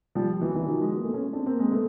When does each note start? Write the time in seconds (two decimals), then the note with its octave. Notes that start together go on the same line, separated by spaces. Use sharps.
0.15 F3 G3
0.41 E3 F#3
0.55 E3 F#3
0.68 D#3 F3
0.81 F#3 G#3
0.94 G#3 A#3
1.03 A3 B3
1.14 B3 C#4
1.33 C4 D4
1.46 A#3 C4
1.59 G#3 A#3
1.72 A3 B3